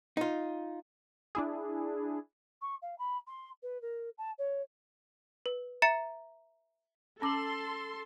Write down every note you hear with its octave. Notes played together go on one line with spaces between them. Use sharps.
D#4 F4
D4 E4 G#4
C#6
F5
B5
C6
B4
A#4
A5
C#5
B4
E5 A#5 A6 C#7
C#4 A4 A5 C6 D6 E6 F#7